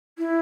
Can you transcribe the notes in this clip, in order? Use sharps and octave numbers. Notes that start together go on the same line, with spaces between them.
E4